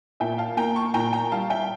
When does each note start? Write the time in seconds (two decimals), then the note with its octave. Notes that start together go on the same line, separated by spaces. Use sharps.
0.20 A#2 E5 G5
0.38 F5 A5
0.57 A#3 G5 A#5
0.76 A5 C#6
0.94 A#2 G5 A#5
1.13 G5 A#5
1.32 G3 F5 A5
1.50 E5 G5